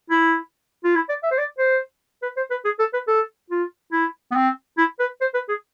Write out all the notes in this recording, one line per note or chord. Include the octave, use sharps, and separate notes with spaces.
E4
F4
E4
D5
E5
C5
D5
C5
B4
C5
B4
G#4
A4
B4
A4
F4
E4
B3
C4
E4
B4
C5
B4
G#4